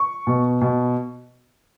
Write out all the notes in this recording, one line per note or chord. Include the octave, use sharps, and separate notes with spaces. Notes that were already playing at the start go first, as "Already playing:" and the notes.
Already playing: C#6
B2
B2